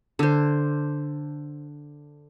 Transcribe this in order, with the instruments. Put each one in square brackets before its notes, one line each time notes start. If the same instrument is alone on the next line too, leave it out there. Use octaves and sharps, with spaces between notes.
[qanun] D3 C5